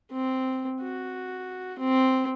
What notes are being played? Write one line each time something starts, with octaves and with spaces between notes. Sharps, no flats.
C4
F#4
C4